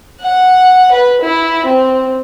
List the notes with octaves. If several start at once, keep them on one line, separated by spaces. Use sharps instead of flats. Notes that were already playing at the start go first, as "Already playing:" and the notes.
F#5
B4
E4
C4